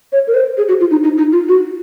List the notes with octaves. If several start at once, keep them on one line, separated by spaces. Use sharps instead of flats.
C#5
A#4
C5
G#4
F#4
F4
D#4
D#4
D#4
F4
F#4